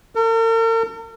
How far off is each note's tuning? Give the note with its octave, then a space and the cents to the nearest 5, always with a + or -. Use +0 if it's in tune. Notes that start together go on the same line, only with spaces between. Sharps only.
A#4 -45